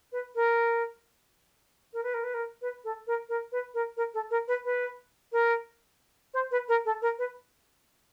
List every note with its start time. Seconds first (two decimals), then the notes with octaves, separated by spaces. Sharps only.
0.12 B4
0.35 A#4
1.93 A#4
2.03 B4
2.14 A#4
2.24 B4
2.34 A#4
2.62 B4
2.84 A4
3.07 A#4
3.29 A#4
3.52 B4
3.74 A#4
3.97 A#4
4.14 A4
4.31 A#4
4.48 B4
4.65 B4
5.32 A#4
6.34 C5
6.51 B4
6.68 A#4
6.85 A4
7.02 A#4
7.19 B4